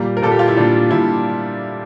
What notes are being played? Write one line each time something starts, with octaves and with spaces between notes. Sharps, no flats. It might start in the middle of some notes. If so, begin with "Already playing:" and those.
Already playing: A#2 G3 A#3
A#4
A#2 G3 A#3 A4
G4
F4
E4
A#2 G3 A#3 D4
A#2 G3 A#3 E4